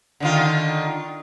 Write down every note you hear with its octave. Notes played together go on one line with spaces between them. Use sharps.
D3 D#3 F4